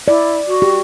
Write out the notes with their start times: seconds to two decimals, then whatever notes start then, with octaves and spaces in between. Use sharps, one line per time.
0.08 E4 D5
0.48 F#4
0.62 G4